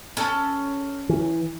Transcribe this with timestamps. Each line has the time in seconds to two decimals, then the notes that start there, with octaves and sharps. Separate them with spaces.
0.17 C#4 A4 A5
1.09 E3